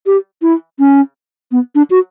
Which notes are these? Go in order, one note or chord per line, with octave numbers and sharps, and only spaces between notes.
G4
E4
C#4
B3
D4
F#4